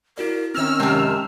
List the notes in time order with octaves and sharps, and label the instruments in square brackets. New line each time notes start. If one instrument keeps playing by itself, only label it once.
[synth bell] E4 F#4 D5 [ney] A#4
[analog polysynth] D#3 E6 F6 [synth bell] C4 F7 [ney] C#4
[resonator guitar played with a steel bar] F#2 C3 [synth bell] G#3 D#5 A5